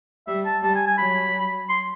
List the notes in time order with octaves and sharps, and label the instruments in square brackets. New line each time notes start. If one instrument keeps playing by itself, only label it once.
[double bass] G3 [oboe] E5
[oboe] A5
[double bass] G3 [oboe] A5
[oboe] G#5
G#5
[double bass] F#3 [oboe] B5
[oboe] C6